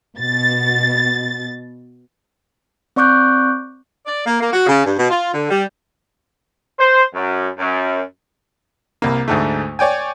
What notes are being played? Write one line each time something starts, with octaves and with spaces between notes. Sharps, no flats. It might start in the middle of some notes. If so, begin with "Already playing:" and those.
B2 A6
C4 D5 C#6 D6 F#6 G6
D5
A#3
A#3
F#4
C#3
G2
B2
F4
D3
G3
C5
F#2
F#2
C2 A#3
D2 G#2 A3
C#5 D5 G5 G#5